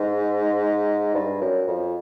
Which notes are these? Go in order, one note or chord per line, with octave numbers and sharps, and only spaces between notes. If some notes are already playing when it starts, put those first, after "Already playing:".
Already playing: G#2
G2
F#2
F2